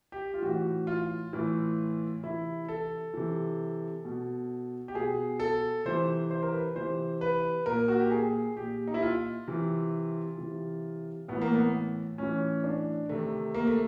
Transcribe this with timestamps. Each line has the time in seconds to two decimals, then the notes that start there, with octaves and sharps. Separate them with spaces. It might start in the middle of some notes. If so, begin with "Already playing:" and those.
0.12 G4
0.34 F4
0.42 A2 E3 F#4
0.87 F4
1.33 A2 E3
2.23 C3 E3 E4
2.68 A4
3.14 C3 E3
4.05 B2
4.88 G4
4.95 B2 G#4
5.40 A4
5.85 C3 E3 C5
6.30 C5
6.43 A#4
6.53 B4
6.76 C3 E3 C5
7.21 B4
7.66 A#2 A#4
7.88 F#4
8.00 G4
8.11 G#4
8.56 A#2 G4
8.87 D#4
8.94 E4
9.02 F4
9.47 C3 E3
10.38 C3 E3
11.28 A2 E3 B3
11.42 A#3
11.54 B3
12.18 A2 E3 C#4
12.64 D4
13.09 C3 D#3 A3
13.54 A#3
13.67 A3